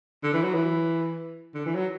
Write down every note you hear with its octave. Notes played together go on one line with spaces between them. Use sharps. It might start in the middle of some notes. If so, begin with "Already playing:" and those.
D3
E3
F#3
E3
D3
E3
F#3